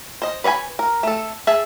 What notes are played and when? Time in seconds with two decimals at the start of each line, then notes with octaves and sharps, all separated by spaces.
0.22 C5 D#5
0.44 B4 C#5 D#5 G#5 B5
0.79 A#4
1.03 A3 A4
1.47 G#4 E5 A5